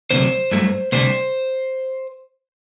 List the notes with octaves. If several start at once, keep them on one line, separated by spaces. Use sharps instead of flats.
D2 C3 F#3 C5
G2 F#3 A3
D2 C3 G3 C5